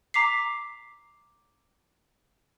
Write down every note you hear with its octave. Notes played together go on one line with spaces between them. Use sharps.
A#5 D6 B6 C7